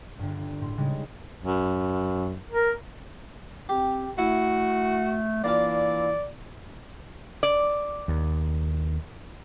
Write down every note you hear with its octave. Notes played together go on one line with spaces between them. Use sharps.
G1 G2
A2 C6
C#3 G3 G#3 D#4
F#2
A#4
C4 G4
A3 E4 F#4
E3 A#3 D4 F4 D5
D5
D#2